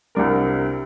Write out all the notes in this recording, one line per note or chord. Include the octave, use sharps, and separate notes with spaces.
C2 C3 G3 D4 A#4